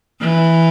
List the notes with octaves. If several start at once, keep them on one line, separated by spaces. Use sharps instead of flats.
E3